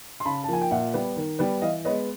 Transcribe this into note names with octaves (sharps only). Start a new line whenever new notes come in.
C6
C#3 A5 B5
A5
F3 A#3 G#5
G5
A#2 E5 F#5
G3 B3
D#3
G3 B3
E3 D#5 F5
G#3 B3 C#5 D#5